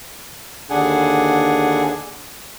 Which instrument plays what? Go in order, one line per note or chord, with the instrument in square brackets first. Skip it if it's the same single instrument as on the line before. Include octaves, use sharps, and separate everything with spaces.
[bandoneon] D#2 D3 D4 G#4 F#5 G#5